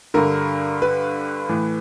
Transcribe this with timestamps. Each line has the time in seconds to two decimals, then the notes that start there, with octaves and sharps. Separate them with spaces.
0.14 G2 D3 A#4
0.82 B4
1.49 A2 E3